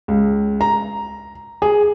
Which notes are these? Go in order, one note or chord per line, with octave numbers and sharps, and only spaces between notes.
C#2
A#5
G#4